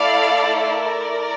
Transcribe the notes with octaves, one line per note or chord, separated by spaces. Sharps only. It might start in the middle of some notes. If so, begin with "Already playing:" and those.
Already playing: A3 E4 A4 D5 F5
A#4 D5